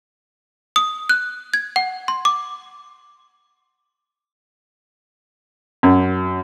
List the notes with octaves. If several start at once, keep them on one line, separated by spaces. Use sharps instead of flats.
D#6
F#6
G#6
F#5
C6
D6
F#2